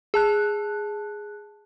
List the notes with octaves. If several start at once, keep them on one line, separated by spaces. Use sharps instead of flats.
G#4 A5 F#6